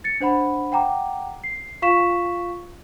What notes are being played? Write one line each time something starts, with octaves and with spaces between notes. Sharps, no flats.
A6 C#7
D4 C5 F#5 B5
F#5 G5 A#5 D6
C7
F4 F5 C#6 B6 E7